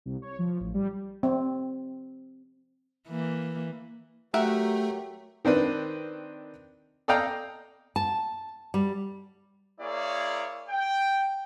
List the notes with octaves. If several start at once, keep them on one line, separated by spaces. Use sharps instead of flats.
C2
C#5
F3
A1
G3
C4
E3 A#3
F#3 A3 G4 A#4 E5 F#5
D#3 C4 D4 B4
A4 D5 D#5 F5 G5 A#5
A5
G3
A#3 E4 G#4 C#5 D5
G5